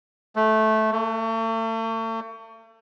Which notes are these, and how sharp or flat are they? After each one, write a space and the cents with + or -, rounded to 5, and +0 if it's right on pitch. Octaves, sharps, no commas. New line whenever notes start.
A3 -10
A3 +40